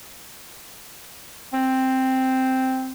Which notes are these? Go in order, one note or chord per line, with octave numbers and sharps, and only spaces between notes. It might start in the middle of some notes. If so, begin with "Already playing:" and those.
C4